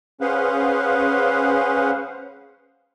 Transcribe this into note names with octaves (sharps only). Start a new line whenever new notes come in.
C#4 G#4 B4 C5 F5 F#5